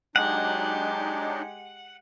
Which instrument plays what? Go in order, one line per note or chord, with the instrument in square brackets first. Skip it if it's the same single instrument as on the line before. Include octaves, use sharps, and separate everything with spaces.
[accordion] F#3 D4 D#4 [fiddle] G#3 G4 [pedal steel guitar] F#5